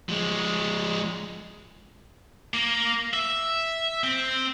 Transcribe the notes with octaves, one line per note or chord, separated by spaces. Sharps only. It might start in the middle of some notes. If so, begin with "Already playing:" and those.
F3 G#3
A#3
E5
C4